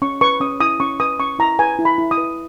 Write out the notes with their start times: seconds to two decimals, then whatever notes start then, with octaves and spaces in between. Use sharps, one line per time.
0.02 C#4 C#6
0.21 B4 C#6
0.40 C#4 D#6
0.60 E4 D#6
0.80 C#4 C#6
1.00 B4 D#6
1.19 C#4 C#6
1.39 E4 A#5
1.59 B4 G#5
1.79 E4
1.85 B5
1.98 E4
2.11 D#6
2.18 B4